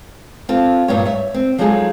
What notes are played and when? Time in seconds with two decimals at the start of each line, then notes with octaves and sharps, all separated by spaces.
0.49 C4 F4 A4 A5
0.88 G2 A#2 B3 G4 C#5
1.05 C#5 E5
1.34 C4
1.58 F3 F#3 G#3 D#4 G#4 A4